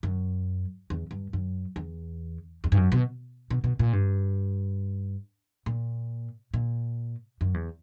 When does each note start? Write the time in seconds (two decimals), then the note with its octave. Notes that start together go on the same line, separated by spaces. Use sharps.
0.03 F#2
0.90 E2
1.11 G2
1.33 F#2
1.76 E2
2.64 E2
2.72 G2
2.77 F#2
2.92 B2
3.50 B2
3.64 B2
3.79 A#2
3.93 G2
5.66 A#2
6.54 A#2
7.41 F#2
7.54 E2